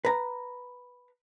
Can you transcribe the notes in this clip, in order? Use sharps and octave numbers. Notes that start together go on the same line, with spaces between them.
B4 A#5